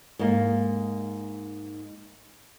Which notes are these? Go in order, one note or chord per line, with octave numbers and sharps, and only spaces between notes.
G#2 A#3